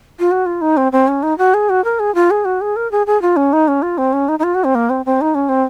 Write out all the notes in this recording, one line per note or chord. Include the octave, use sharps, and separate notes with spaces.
F4
F#4
F4
D#4
C4
C4
C#4
D#4
F#4
G#4
F#4
A#4
G#4
F4
G#4
F#4
G#4
A#4
G#4
G#4
F4
C#4
D#4
C#4
F4
C4
C#4
D#4
D#4
F4
F#4
C4
A#3
C4
C4
D#4
C#4
C4